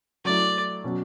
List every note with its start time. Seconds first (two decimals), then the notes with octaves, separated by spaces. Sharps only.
0.25 F#3 A3 E4 D5
0.84 B2 F#3 C#4 F#4